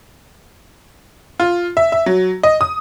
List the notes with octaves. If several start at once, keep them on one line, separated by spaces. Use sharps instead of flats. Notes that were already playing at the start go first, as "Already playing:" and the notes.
F4
E5
E5
F#3
D#5
D#6